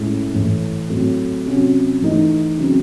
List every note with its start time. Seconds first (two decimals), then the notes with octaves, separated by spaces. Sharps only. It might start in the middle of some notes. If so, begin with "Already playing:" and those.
Already playing: A2 G#3 C#4 E4
0.34 A2 E3 A3
0.90 A2 F#3 C4
1.46 C3 F#3 C#4 F#4
2.02 E3 A3 D#4
2.58 C#3 F#3 C4